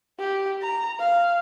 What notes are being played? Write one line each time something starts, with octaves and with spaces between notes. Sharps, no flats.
G4
A#5
F5